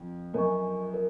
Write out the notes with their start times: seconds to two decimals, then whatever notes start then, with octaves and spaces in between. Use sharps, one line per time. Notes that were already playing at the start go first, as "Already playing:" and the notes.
Already playing: F2
0.34 F#2 A#4 D#5 G#5 C#6
0.94 A#4